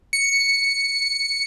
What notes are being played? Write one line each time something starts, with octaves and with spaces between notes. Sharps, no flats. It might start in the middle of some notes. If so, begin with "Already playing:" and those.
C#7